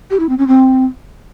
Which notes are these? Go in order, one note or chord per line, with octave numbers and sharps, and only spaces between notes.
G4
E4
C4
C#4
C4